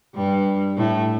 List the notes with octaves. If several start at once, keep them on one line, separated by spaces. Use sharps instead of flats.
G2 G3
A2 A3